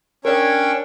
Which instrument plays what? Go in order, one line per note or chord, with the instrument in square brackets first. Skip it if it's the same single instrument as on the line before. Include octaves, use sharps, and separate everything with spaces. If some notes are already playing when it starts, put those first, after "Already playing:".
[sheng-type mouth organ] C#4 C#5 C#6 [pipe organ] D4 G5 [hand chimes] A#4 D5